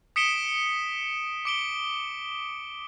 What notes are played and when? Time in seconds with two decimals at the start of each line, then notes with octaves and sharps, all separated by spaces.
0.16 D#6 B6 C#7 D7 E7 G7
1.45 D6 D7 G7